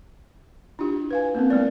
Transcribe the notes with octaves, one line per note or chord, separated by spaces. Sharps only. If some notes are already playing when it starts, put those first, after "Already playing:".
D4 E4 F4 G4
B4 F5 G#5
A#3 C4 C#4 A#4
G#3 B3 E4 A#4 D5